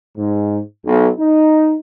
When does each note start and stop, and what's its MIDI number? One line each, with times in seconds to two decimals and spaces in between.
0.17 0.59 44
0.86 1.08 35
1.18 1.75 63